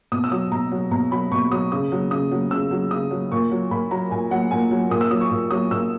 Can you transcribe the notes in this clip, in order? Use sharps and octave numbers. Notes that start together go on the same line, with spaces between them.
B2 D#6
E6
F#3 D#6
B2 A#5
F#3
B2 A#5
F#3 B5
B2 C#6
F#3 D#6
C#3 D#6
F#3
C#3 D#6
F#3
C#3 E6
F#3
C#3 D#6
F#3
A#2 C#6
F#3
A#2 B5
F#3 A#5
A#2 G#5
F#3 F#5
A#2 G#5
F#3
A#2 D#6
E6
F#3 D#6
C#6
A#2
F#3 D#6
A#2 E6